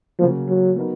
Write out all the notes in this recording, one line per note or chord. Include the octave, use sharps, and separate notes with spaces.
C#3 F3 F#3 A#3
F#3
F#3 B3 D#4 A#4